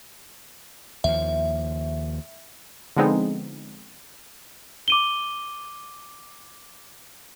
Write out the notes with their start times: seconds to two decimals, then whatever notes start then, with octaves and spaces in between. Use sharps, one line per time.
1.04 D#2 F3 E5
2.97 D3 F3 G#3 B3 C4 D#4
4.88 D6 D#7 G7